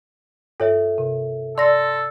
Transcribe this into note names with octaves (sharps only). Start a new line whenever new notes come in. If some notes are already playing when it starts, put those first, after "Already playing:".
G2 A4 C#5 E5
C3
A4 D5 C6 A#6